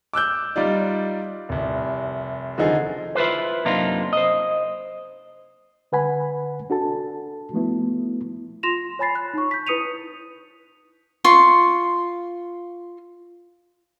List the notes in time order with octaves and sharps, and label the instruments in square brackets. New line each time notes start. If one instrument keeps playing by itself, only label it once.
[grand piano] D6 E6 F#6 G6
G3 D#4 F4 D5
F1 C2
D3 D#3 F3 D#4 G#4
[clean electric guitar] E4 F4 B4 C5
F#2 C3 A#3 D4 D#4 F4
C5 D#5
[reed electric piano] D3 B4 F#5 G#5 B5
D4 F#4 A4 A5
F3 A3 B3 E4
[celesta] F4 C6 A#6 E7 F7
C#5 G#5 B5 A6 C7
F#6
D#4 C#6
G6 B6
E4 B4 D#6 C#7 D#7 F7
[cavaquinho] F4 C6 C#6